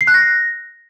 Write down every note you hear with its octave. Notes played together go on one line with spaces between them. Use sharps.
C7
F#6
A#6